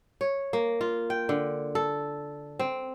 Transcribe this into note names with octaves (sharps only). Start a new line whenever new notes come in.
C#5
A#3
F4
G5
D3
A4
C4